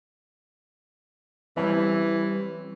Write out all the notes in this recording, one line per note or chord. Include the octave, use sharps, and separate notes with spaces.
E3 G3 C4 C#4